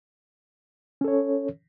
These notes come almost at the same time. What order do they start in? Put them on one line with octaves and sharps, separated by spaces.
C#4 A4 C#5